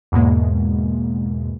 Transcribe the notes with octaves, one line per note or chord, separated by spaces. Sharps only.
E2 G#2 B2 G#3 A#3